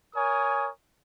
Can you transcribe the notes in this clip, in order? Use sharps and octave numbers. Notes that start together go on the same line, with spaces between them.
A#4 C#5 G#5 D#6